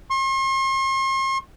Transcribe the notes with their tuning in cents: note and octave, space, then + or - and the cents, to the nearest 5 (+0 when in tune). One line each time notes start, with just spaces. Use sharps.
C6 +45